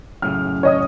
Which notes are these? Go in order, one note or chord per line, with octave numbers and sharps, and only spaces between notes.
F#2 A2 C#3 F6
C#5 D#5 D#6